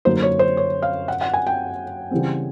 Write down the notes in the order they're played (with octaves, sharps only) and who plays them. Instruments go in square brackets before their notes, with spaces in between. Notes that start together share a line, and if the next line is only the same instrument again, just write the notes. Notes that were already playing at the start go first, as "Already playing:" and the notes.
[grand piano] F#2 D3 F#3 A#3 D#4 [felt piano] C5
[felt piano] C#5
C5
C#5
F5
F#5
F#5
G#5
G5
[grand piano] C#3 E3 G3 C4